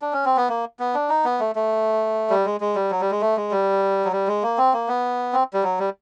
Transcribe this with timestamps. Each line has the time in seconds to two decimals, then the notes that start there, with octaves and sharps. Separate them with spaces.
0.02 D4
0.13 C#4
0.25 C4
0.37 B3
0.49 A#3
0.79 B3
0.94 D4
1.09 D#4
1.25 B3
1.40 A3
1.55 A3
2.30 G3
2.45 G#3
2.61 G#3
2.75 G3
2.91 F#3
3.01 G3
3.11 G#3
3.21 A3
3.37 G#3
3.51 G3
4.05 F#3
4.12 G3
4.27 G#3
4.43 A#3
4.57 C4
4.73 A#3
4.88 B3
5.33 C4
5.53 G3
5.63 F#3
5.79 G3